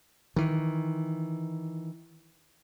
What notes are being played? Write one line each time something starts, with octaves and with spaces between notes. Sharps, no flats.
D#3 E3